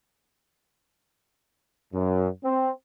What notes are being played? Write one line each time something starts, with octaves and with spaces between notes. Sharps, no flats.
F#2
C4